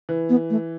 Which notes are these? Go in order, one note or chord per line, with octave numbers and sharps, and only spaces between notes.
E3
B3
A3